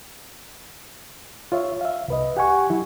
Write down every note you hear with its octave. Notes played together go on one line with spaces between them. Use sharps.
F4 C#5 E5
E5 F5
C2 B4 D#5
G4 F#5 G#5 C#6
F#3 E4